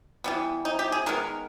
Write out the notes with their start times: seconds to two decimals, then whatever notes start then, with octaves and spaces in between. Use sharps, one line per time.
0.24 E3 G3 B3
0.65 D#4
0.79 G4
0.92 G#4
1.06 D#3 G#3 B3 A#4